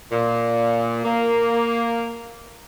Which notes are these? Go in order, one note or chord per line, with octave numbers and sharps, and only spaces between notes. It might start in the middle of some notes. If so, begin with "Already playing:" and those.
A#2
A#3